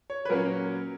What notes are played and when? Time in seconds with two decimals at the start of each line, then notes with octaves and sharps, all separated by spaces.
0.10 C#5
0.25 B4
0.30 A#2 F#3 A#3 C#4 A#4